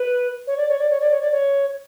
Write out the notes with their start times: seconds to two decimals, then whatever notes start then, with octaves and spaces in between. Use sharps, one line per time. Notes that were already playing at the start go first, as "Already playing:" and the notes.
Already playing: B4
0.47 C#5
0.57 D5
0.68 C#5
0.78 D5
0.89 C#5
1.00 D5
1.10 C#5
1.21 D5
1.31 C#5